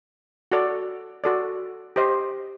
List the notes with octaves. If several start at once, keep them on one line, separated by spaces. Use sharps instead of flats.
F#4 A4 D5
F#4 A4 D5
G4 C5 D#5